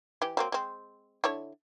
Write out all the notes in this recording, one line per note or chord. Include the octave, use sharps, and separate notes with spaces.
E3 G4
F#3 A#3 C4
G#3 C4
D3 E4 C#5